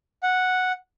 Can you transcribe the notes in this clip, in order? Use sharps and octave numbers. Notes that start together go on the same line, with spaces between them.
F#5